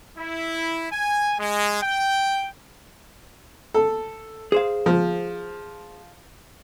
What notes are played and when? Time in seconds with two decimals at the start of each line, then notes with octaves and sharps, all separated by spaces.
0.17 E4
0.91 G#5
1.39 G#3
1.82 G5
3.74 A4
4.52 G#4 C5 F5
4.86 F3